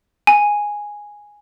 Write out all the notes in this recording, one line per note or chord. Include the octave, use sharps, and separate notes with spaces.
G#5